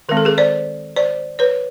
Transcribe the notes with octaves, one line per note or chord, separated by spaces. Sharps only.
D#3 G#3 C4 A#4
A4
G#4 A#4
C5 D5
C5 D5
B4 C#5